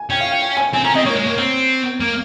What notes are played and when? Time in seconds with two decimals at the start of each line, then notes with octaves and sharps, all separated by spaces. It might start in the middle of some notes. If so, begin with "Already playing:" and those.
Already playing: G#5
0.10 C#4 G5
0.20 F5
0.31 G5
0.41 G5
0.57 G#5
0.73 C4 G#5
0.84 C#4 A#5
0.94 C4 D#5
1.06 A#3 C#5
1.16 G#3
1.26 A#3
1.37 C4
2.00 A#3